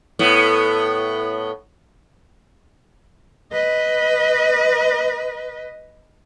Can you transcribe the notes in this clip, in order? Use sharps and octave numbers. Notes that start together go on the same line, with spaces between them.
A2 B3
B4 D#5